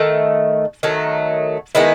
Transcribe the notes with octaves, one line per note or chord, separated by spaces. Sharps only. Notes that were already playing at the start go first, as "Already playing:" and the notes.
Already playing: D#3 A3
D#3 F#3 A3
D#3 G#3 B3 E4